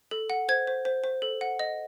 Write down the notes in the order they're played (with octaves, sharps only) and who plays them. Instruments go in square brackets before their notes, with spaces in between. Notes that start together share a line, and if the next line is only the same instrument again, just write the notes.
[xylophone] A4
F#5
C5 G#6
C5
C5
C5
A4
F#5
D#5